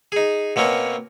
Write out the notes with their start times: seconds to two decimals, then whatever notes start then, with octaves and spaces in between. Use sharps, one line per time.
0.12 D#4 G#4
0.56 B2 A#3 C4 C#4 A#4